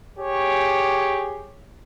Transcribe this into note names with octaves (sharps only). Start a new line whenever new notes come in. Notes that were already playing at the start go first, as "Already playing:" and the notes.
G4 G#4 C#5